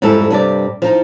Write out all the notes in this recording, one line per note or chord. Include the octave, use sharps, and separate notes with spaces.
F2 G#2 G3 E4 A4
G2 C3 G3 D5
F3 D#4